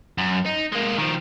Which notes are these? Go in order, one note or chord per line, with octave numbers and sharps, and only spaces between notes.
F#2
D#4
G#3 A#3
D#3 F3